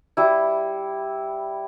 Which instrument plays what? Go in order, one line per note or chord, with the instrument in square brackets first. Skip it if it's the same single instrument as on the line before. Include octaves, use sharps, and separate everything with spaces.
[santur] G3 E4